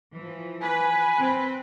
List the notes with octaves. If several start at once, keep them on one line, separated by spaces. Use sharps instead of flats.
E3 F3
B4 G#5
C4